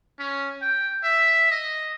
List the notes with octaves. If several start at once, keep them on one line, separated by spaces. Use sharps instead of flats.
C#4
G5
E5
D#5